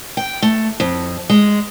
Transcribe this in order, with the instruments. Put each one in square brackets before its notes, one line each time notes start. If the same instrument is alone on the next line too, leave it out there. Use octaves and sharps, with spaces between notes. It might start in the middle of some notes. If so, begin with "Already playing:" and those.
[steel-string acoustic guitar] G5
A3
F2
G#3